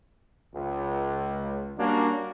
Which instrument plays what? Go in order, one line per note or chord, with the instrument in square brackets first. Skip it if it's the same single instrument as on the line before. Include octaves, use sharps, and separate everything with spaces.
[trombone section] C#2
G3 A#3 C#4 D4 F#4